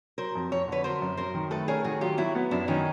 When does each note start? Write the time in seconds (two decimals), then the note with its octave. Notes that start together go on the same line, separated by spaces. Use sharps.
0.18 F#3 A#4 C5
0.35 F2
0.51 F2 C#5
0.68 D3 B4 C#5
0.84 F#3 A#4 C5
1.02 F#2
1.17 F#2 A#4 C5
1.34 D#3
1.51 A3 A4 B4
1.68 C#4 G#4 A#4
1.84 D#3 F#4 G#4
2.01 F#3 F4 G4
2.18 F#3 E4 F#4
2.35 B3
2.51 F#2 D4 E4
2.68 D#3 C#4 D#4